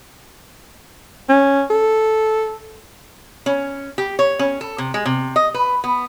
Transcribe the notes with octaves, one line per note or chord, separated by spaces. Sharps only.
C#4
A4
C#4
G4
C#5
C#4
A4
C3
G#3
C3
D#5
B4
B3